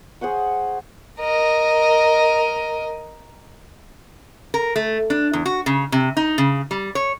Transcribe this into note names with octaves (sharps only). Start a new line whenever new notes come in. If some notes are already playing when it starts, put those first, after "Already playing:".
G#4 C5 F#5 C#6
A#4 D#5
A#4
A3
D4
E2
F#4
C#3
C3
D#4
C#3
G3
C#5